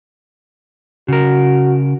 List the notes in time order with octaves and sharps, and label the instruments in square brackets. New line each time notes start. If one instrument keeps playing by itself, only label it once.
[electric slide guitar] C#3 A#4 [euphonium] F#4